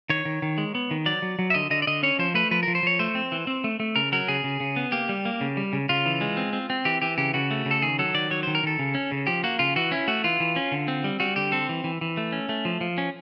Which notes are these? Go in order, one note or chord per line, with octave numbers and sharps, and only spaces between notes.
D#3 C#5
D#3
D#3
G#3
B3
D#3
F#3 D5
F#3
F#3
E5
D3 D#5
D3 D#5
D5
D3 D#5
C#4 C#5
F3 C5
A3 B4
F3 B4
F3 A#4
C5
F3 C#5
A3 C5
C4
E3
C4
A3
A3
C#3 A#4
F#3 A#4
C#3 G#4
C#3
C#3
B3
A#3 G4
G3
A#3
C#3
G3
C#3
C#3 F4
E3
G#3
C4
C4
C4
E3 G4
E3 G4
C#3 G4
C#3 F#4
A3
C#3
A4
D#3 G#4
F#3 A4
D#3 D5
F#3 C#5
D#3 C5
A#4
D#3 A4
C#3
C#4
C#3
F3 G4
A#3 F#4
C#3 F4
E3 F#4
C#4 E4
A3 F#4
E3 F4
E3
C#4
D3
C4
G3
G3 F#4
D3 G4
C4 A4
E3
E3
E3
A3
C#4
A3
F3
F3
C#4